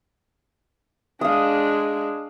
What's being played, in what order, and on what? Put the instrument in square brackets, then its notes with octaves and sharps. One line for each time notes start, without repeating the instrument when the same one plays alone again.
[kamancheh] G#3 D4 [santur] F5 D#6